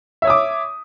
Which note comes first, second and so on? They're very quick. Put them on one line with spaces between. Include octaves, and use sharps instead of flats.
E5 C#5 D#6 D6